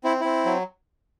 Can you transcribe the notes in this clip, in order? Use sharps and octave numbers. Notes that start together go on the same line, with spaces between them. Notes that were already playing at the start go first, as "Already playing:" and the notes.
C4 E4
C4 E4
F#3